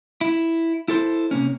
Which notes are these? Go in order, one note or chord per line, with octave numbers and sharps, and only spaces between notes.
E4
E4 A4 C5
C3 A#3 C#4